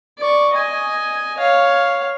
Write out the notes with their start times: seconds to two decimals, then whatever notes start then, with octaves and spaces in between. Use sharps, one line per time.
0.18 D5 C#6
0.53 D#5 G#5
1.38 C#5 F5